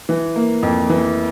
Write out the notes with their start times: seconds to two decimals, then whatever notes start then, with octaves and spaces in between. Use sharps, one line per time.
0.09 E3
0.36 A#3
0.63 F2
0.89 E3